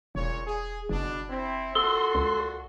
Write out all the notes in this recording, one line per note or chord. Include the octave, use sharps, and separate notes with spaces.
E1 A#2 C#3 C#5
G#4
F#1 B2 D4
C4 E4
A#2 F#4 A4 C6
C#2